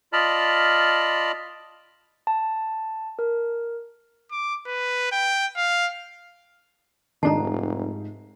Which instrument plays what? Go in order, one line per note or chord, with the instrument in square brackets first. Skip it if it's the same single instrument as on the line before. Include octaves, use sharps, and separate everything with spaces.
[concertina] F4 D5 D#5 A5 B5 F6
[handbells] A5
A#4
[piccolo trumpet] D6
B4
G5
F5
[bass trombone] F1 [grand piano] G#2 C7 [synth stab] D#3 D4 D#4 [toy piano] A5 A#5